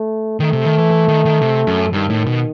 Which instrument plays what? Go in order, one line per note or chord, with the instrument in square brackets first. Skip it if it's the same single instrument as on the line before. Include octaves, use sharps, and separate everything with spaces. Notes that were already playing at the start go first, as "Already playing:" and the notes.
Already playing: [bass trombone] A3
[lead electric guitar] D#3 [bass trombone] A3
[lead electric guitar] C3
D#3
E3
E3
D#3
D#3
C3
F#2
[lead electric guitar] G2 [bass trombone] D#3
[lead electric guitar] A2
B2